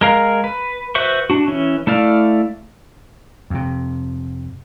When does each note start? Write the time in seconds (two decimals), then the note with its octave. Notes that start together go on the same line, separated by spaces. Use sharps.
0.01 G#3 A#4 F5
0.44 B4
0.95 F#4 B4 C5 E5 C#6
1.30 D4 F#4
1.47 E3 C#4
1.87 A3 E4 D5 F5
3.50 F2 C3